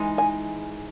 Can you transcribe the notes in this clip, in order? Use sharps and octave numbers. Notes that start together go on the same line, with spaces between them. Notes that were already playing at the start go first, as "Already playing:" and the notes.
Already playing: E3 G#3 D#4
G#5